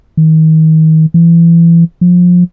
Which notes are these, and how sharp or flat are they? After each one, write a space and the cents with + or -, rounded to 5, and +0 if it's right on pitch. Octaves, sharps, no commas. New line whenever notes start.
D#3 +30
E3 +30
F3 +25